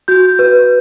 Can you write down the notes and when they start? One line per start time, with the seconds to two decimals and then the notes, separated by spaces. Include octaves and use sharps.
0.08 F#4 G6
0.39 B4